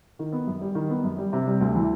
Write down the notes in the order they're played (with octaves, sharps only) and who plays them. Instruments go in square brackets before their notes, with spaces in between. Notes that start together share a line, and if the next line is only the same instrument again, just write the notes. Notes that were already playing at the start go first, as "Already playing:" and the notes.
[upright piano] D#3
B3
F#2
G3
D#3
B3
F#2
G3
C3
G3
D2
E3